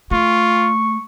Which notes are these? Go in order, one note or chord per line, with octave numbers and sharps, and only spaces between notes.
A3 F4 C#6